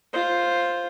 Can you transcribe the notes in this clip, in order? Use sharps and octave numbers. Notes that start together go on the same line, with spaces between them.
F4 C5